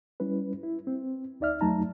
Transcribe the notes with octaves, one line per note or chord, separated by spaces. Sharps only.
G3 C#4 E4 B4
E4
C4
D2 D#4 D5 E5 F6
F2 F#3 A3 D#4 A5 A#5